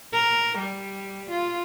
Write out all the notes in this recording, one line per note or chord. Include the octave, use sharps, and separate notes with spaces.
A#4
G3
F4